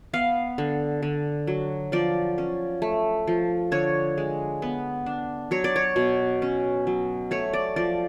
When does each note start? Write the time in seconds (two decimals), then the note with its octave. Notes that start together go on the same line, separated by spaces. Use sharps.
0.13 B3 F5
0.58 D3
1.03 D3
1.47 F#3
1.92 F3 D5
2.38 C#4
2.82 A3
3.27 F3
3.72 D3 C#5
4.17 G#3
4.62 B3
5.06 D4
5.51 F#3 C#5
5.64 D5
5.76 C#5
5.96 B2
6.42 C#4
6.87 F#3
7.31 A3 C#5
7.53 D5
7.76 F3 D5